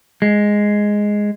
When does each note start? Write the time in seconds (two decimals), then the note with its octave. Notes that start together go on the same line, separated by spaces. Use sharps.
0.22 G#3